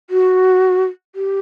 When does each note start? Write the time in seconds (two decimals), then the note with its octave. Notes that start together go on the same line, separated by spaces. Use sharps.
0.10 F#4
1.15 G4